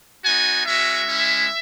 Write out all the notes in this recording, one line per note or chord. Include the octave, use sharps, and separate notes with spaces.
B3 D#4 F#4 G#5
G#3 C#4 F#4 E5
G#3 C#4 E4